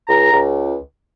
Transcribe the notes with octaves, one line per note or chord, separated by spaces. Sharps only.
C#2 A#5
C#2